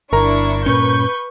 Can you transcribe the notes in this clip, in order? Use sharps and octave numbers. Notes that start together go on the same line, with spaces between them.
G1 D4 E4 A#4 A#5 C#6
G2 A#2 C#4 B4 C#6 G6